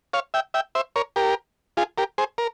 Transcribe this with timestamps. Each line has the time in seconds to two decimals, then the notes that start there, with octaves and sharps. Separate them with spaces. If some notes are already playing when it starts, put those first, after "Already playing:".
0.13 C#5 F5
0.34 E5 G5
0.54 E5 G5
0.75 C5 E5
0.96 A#4 C#5
1.16 G4 A#4
1.77 F4 G#4
1.98 G4 A#4
2.18 G#4 C5
2.38 A#4